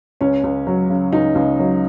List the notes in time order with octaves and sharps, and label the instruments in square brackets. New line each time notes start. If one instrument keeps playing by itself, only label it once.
[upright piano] C#2 C#4
C#2
F#3
C#3
C#2 D#4
C#2
F#3